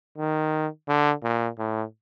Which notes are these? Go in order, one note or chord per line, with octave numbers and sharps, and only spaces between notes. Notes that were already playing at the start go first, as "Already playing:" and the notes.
D#3
D3
A#2
A2